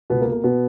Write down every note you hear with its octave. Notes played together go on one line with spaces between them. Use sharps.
C#2 B2 B3
A#3
B2
A#3
B2 B3